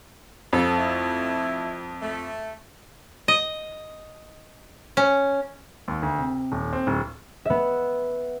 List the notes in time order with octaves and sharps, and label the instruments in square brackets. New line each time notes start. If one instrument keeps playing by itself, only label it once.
[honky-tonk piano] F2 [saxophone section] A4
[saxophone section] A3 E4
A3
[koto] D#5
C#4
[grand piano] D#2
D2
C3
D#1
C4
D1
[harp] B3 E5